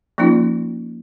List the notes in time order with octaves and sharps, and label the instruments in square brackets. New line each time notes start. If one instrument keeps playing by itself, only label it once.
[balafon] F3 A#3 C#4 D#4 F4